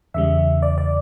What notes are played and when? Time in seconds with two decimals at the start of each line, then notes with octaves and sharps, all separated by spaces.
0.14 E2 C#3 G3 E5
0.63 D5
0.78 D5